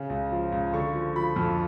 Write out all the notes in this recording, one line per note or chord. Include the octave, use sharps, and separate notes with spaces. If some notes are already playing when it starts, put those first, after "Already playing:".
Already playing: C#3
C#2
F3
C#2
D3 C#6
F3
F3 B5
F2